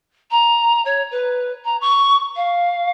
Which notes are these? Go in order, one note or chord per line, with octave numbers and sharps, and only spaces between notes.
A#5
C#5
B4
A#5
C#6
F5